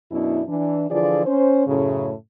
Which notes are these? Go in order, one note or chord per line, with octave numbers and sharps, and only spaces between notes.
F#2 B2 B3 D4 E4
E3 D4
D3 E3 F3 F4 G#4 D5
C#4 C5
F#2 A2 C#3